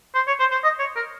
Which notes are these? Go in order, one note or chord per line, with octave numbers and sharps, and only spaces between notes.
C5
C#5
C5
C5
D#5
C#5
A#4